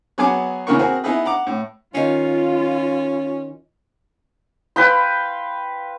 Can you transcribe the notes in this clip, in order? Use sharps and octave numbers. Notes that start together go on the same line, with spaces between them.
F#3 B3 G#4 F#5 G#5 D6
C#3 E3 A#3 B3 A#4 C#6
C4 F#4 G#4 A#4
B3 D#4 E4 G#4 B4
F#5 A#5 D6
A2
D#3 C#4 F4 F5
B4 F5 G5 C6